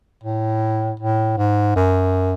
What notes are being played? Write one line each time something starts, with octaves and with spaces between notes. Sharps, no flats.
A2
A2
G#2
F#2